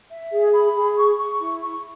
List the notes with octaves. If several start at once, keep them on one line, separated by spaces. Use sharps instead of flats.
E5
G#4
B5
G#4
C#6
C#6
E4
C#6